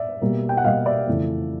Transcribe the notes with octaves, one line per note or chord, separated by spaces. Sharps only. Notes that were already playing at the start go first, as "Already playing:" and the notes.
Already playing: D5 E5
B2 G3 A#3
G5
F#5
B2 G3 A#3 D#5 F5
D5 E5
F2 C#3 E3 A3